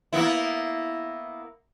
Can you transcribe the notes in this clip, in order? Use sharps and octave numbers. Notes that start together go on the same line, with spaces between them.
A#3 B3 E4